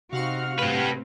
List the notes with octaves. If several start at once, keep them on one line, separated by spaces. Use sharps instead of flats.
C3 C4 D#4 F#4 F5 F#5 F6
A2 C4 G4 B4